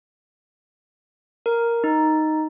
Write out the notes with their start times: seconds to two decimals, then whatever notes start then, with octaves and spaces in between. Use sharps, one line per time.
1.46 A#4
1.84 D#4